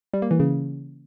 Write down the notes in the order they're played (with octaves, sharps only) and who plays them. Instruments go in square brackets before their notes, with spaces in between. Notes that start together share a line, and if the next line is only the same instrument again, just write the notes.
[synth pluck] G3
A#3
E3
C#3